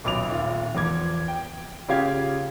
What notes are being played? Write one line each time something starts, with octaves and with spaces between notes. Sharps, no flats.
D#1 B1 D6 F7
D#1 F4
E2 F3 D6 G#6
G5
C#3 F4 G4 F5 G#6